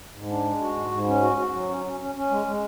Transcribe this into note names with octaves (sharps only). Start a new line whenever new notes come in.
G#2
D4
G#3
F#4
G#2
G#2
C#4
F#4
F#4
F#3
C#4
C#4
C#4
C#4
G#3
G#3